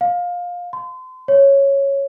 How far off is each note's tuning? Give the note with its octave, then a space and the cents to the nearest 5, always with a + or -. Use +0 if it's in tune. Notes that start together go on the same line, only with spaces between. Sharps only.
F5 +20
C6 -35
C#5 -5